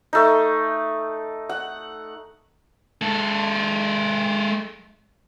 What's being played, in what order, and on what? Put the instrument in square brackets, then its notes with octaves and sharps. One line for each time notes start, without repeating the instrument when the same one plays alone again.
[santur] A3 D#4
F#5
[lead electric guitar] G#3 A4